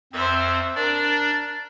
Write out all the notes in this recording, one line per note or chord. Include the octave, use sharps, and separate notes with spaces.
F2 C4 C5 E5
D4 A#4 D5